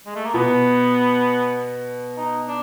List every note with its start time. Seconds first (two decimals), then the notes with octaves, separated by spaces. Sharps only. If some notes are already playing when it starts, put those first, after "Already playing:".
0.06 G#3
0.16 A3
0.25 A#3
0.34 B2 B3
2.17 D#4
2.48 D4